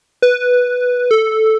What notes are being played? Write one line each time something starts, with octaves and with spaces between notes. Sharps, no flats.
B4
A4